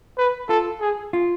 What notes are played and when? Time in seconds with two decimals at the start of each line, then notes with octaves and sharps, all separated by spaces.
0.18 B4
0.49 F4 A4
0.81 G#4
1.13 F4